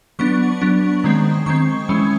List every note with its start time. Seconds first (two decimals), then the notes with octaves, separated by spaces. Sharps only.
0.19 F#3 B3 D4 C#6
0.61 F#3 B3 D4
1.04 D#3 G#3 C4
1.46 D#3 G#3 C4 C#6
1.89 E3 G#3 C#4